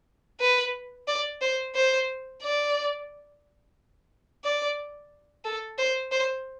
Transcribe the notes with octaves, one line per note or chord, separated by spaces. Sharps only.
B4
D5
C5
C5
D5
D5
A4
C5
C5